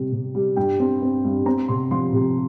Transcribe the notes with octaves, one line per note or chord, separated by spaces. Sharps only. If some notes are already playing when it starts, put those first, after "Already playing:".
Already playing: C3 G3
C3
G3
G2 G5
C4
C4
G2
C4 A#5
C3 C6
F3 C6
C3